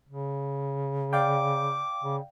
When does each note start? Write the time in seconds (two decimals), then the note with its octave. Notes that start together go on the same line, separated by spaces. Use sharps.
0.09 C#3
1.13 D5 F5 G5 D6
2.03 C#3